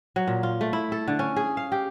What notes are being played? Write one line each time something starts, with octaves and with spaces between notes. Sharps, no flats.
F#3
A#2
F4
A3
E4
A4
D3
C#4
G#4
F5
G4